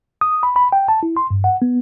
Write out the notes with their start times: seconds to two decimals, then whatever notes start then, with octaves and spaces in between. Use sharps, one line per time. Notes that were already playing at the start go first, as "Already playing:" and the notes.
0.21 D#6
0.43 B5
0.56 B5
0.72 G5
0.88 A5
1.03 E4
1.17 C6
1.31 G2
1.44 F#5
1.62 B3